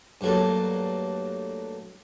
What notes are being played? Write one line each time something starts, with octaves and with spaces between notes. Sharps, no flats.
G2 F#3 A3 A#3